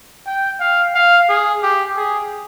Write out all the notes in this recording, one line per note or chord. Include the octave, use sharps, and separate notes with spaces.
G5
F5
F5
G#4
G4
G#4